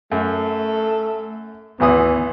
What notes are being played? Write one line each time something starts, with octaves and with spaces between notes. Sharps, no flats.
F#2 A3
G#1 D2 E3 B3 D#6